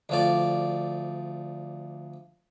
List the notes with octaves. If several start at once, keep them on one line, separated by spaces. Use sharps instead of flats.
D2 F3 D5